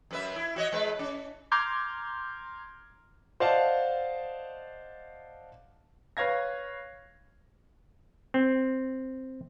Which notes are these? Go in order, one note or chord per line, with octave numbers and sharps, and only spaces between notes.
F#2 B4 E5
E4
F#4 C#5 D#5
G#3 B4
C#4
A#5 C6 D6 F6 G6 G#6
C5 D5 D#5 F5 F#5 A5
B4 C#5 F5 G#6 A#6
C4